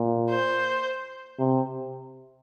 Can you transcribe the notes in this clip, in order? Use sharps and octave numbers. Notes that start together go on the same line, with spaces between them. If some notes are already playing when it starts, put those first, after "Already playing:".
Already playing: A#2
C5
C3